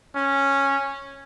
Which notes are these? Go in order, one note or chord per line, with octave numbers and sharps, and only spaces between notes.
C#4